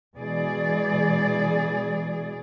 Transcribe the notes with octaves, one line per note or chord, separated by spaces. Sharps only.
B2 E3 G#3 G#4 D5